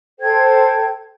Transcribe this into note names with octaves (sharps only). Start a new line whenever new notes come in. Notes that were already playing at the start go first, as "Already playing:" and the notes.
A4 C5 G5 G#6